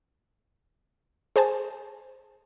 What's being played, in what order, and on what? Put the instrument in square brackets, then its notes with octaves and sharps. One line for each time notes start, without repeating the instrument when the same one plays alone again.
[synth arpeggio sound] G#4 C5 G#5 A5